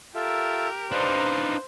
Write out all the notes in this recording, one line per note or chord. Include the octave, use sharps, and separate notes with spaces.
F4 G4 A4 A#4 E5
D4 D#4 B4 C5 F5